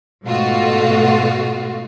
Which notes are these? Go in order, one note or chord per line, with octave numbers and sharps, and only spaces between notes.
G#2 B2 A3 F4 F#4